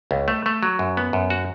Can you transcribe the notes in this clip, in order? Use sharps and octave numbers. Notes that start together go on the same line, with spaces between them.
C#2
A3
A3
F#3
F#2
B3
F#2
F#4